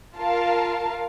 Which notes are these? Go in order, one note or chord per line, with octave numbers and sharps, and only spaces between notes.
F4 A#4 F5 A5